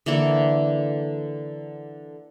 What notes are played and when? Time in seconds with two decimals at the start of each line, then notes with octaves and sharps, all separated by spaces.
0.06 D3 E3 A#3 A4